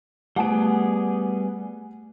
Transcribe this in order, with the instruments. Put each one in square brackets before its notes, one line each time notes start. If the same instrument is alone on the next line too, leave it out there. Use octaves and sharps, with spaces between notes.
[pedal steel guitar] G3 B3 G#4 [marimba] A3 [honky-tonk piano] F#5 G#5 D7